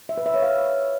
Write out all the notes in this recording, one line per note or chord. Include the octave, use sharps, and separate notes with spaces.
E5
B4
E5
C#5
F5